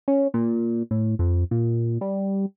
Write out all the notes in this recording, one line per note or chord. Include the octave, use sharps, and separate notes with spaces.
C#4
A#2
A2
F2
A#2
G3